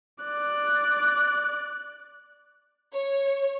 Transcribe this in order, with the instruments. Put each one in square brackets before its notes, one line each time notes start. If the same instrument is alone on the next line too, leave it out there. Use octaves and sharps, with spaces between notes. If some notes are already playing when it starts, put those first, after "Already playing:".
[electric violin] D5 F#6
[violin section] C#5